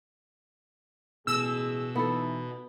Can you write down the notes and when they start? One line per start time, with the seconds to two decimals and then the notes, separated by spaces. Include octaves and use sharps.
1.27 A1 B2 G#3 G#4 E6
1.95 E3 B3 D#4 A4